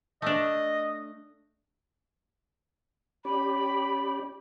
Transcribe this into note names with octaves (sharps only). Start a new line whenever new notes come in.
A3 D4 D#5
C#4 G4 D5 B5